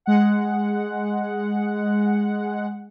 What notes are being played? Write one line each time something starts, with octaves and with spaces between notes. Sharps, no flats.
G#3 F#5